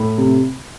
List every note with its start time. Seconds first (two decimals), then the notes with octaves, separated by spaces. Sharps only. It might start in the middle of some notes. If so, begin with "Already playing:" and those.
Already playing: A2 B5
0.18 C3